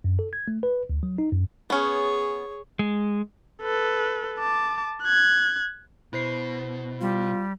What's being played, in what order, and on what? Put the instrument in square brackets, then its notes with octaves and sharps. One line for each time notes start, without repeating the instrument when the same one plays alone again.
[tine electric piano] F#2
A4
G#6
A3
B4
D2
F#3
D#4
F#2
[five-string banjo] B3 C#4 [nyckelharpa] G#4 C#5
[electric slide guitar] G#3
[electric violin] A4 B4
A5 D6
F#6 G#6
[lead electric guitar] B2 [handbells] E4 C5 C7
[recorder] G3 [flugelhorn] F4